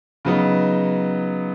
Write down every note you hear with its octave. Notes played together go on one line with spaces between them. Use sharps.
C#3 F#3 B3 D#4